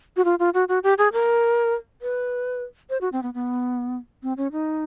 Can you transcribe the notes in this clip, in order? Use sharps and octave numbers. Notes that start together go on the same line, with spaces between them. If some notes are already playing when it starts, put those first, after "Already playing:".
F#4
F4
F4
F#4
F#4
G4
G#4
A#4
B4
C5
F#4
C4
B3
B3
C4
C#4
D#4